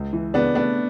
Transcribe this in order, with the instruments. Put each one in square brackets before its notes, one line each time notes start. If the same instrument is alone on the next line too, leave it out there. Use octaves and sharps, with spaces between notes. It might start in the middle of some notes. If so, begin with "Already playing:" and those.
Already playing: [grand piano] C#2
E3
[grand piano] C#3 [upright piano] B3 D4
[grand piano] A3 [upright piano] B3 D4